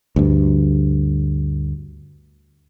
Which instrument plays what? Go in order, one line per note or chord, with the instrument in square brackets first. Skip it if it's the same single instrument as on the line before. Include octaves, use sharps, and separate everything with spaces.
[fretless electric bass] D2 G2